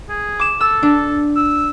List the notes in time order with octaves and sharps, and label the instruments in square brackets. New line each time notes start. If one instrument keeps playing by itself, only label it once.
[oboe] G#4
[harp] D6 E7
[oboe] A4 [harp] E6
[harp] D4
[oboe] E6